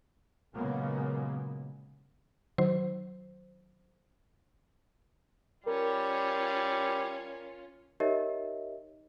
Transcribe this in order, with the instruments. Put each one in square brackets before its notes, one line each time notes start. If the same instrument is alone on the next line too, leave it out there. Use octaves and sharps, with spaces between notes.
[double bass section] A#2 C#3 F#3 G#3 A#3 B3
[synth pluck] D#3 F#3 C5
[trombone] G3 [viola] C#4 F4 [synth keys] A#4
[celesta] D#4 G4 A#4 C#5 D#5 E5